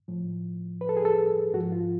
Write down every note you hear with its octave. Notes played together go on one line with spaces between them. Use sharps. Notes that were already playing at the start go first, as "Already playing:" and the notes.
A2 F3
B4
A4
G#4
A4
G#2 F3 F#4
F4